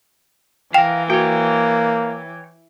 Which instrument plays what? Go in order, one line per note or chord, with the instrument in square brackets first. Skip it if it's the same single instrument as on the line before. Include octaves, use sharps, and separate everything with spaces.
[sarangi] E3 [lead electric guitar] A#4 F5 [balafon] G5
[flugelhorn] A#3 [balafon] F#4 [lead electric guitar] C#5 G5